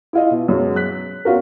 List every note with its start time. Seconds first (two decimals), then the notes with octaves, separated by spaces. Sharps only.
0.13 E4 F4 D#5
0.31 B2
0.48 F#2 B2 F#3 G#3
0.76 F#6 B6
1.25 B3 C#4 F4 F#4 A#4